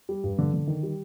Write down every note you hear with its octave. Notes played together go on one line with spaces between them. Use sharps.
G3
G2
D3
D3
D#3
G3